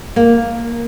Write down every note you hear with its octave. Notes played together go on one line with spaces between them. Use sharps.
A#3